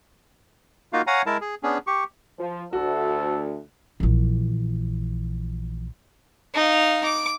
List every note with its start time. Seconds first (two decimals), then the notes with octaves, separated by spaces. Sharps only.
0.93 A#3 D#4 F4 F#4 F5
1.07 C#5 F5 F#5 G#5 A#5
1.26 G#3 E4 A#4 A5
1.41 G#4
1.63 B3 C#4 D4 G#4
1.87 G4 C#6
2.39 F3
2.73 D2 F#4 A4
4.00 A#1 E3
6.55 D#4 F5
7.04 D6